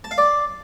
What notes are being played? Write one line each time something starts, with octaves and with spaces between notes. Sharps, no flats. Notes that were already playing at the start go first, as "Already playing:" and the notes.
A5
F5
D5